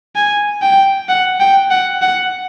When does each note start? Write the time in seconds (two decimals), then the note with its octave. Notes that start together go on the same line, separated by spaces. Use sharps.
0.16 G#5
0.62 G5
1.09 F#5
1.40 G5
1.71 F#5
2.02 F#5